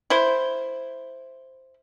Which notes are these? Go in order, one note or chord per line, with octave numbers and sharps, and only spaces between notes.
E4 C5